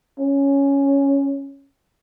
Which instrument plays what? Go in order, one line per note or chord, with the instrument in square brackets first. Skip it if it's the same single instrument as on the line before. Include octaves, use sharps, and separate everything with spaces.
[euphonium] C#4